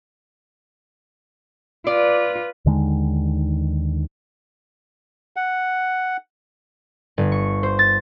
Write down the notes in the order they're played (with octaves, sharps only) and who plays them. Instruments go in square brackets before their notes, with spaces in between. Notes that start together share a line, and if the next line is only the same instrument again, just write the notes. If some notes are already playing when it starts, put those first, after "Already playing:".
[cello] F4 B4 [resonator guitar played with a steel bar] D5
[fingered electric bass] D#2 D3 D#3 G#3
[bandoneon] F#5
[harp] G1
C#6
C5
A6